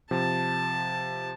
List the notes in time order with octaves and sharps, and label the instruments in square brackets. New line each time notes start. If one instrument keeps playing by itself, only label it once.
[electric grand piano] C3 F3 [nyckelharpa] A5